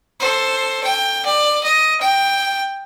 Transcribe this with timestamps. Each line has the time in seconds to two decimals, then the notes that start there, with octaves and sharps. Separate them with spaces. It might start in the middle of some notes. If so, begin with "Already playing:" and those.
0.20 A4 C5
0.84 G5
1.26 D5
1.64 D#5
2.01 G5